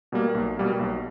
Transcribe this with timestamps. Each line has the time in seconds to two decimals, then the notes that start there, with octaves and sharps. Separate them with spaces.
0.12 B2 G3 A#3
0.35 B1
0.57 B2 G3 A#3
0.80 B1